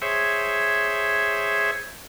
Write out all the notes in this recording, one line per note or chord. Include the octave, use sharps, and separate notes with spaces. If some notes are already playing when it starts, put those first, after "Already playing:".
G#4 C5 C#5 E5